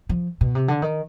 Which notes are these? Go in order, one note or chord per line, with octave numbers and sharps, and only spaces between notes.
F3
B2
C3
D3
D#3